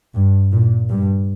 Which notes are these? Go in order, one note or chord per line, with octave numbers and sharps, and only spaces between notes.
G2
A#2
G2